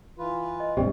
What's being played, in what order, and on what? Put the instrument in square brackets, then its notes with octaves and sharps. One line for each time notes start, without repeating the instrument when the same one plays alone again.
[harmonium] E3 F4 B4
[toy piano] D#5
[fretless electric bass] E1 G2 C3 [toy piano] G4 D5 G5